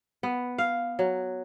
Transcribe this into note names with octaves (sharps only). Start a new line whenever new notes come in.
B3
F5
F#3